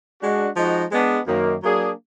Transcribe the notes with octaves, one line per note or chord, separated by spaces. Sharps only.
G#3 D4 F#4
F3 G#3 D#4 F#4
G#3 B3 D4
F#2 D#3 A#3
F#3 A#3 D4 G#4